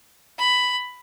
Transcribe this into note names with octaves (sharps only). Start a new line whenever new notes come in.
B5